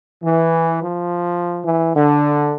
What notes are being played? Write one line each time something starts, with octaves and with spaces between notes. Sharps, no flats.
E3
F3
E3
D3